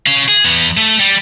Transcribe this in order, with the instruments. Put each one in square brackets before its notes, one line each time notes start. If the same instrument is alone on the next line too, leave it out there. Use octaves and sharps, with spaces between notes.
[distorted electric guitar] C#4 F5
G#4
E2 B3
A3
G3